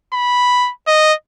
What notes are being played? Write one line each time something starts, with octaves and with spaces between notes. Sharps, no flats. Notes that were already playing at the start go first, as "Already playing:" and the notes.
B5
D#5